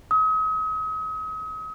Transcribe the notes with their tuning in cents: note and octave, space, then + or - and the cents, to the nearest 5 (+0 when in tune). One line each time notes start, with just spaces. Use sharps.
D#6 +40